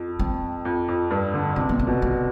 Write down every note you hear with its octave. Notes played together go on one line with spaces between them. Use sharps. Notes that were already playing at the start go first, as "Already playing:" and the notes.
Already playing: F2
C4
F2
F2
G2
D3
C3 D4
B3
C4
B2
C4